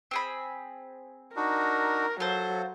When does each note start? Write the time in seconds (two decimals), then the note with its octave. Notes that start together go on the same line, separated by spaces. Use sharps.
0.11 C4 G#4 B5
1.36 D4 D#4 F#4 A#4
2.20 F#3 F4 A4 C5